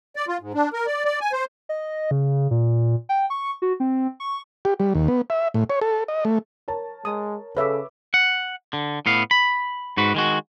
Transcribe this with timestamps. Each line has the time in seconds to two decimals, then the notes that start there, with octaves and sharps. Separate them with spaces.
0.16 D5
0.28 F4
0.41 G#2
0.54 D4
0.73 A#4
0.86 D5
1.05 D5
1.21 G#5
1.32 C5
1.69 D#5
2.11 C#3
2.51 A#2
3.09 G5
3.30 C#6
3.62 F#4
3.80 C4
4.20 C#6
4.65 G4
4.80 G3
4.95 D#2
5.08 B3
5.30 E5
5.54 A2
5.70 C#5
5.81 A4
6.08 D#5
6.25 A3
6.68 A#4 C#5 A5
7.05 G#3 D#6
7.57 C#3 A4 B4 C#5 E5 D6
8.14 F#5
8.73 D3
9.06 A2 B3 F5
9.31 B5
9.97 G#2 F#4 B4
10.14 D#3 G#3 F#4